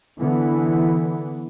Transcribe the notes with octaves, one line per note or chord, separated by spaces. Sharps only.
D3 E3 B3